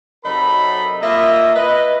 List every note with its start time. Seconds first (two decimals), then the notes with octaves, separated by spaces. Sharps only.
0.25 C3 F#3 D#4 A4 A#4 B5
1.01 A#3 F4 D#5 E5
1.55 B4 D#5